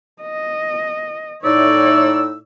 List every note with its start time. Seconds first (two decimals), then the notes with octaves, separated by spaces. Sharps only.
0.22 D#5
1.44 A2 D#4 C#5 D5 E6